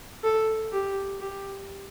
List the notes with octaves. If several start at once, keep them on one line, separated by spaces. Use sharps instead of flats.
A4
G4
G4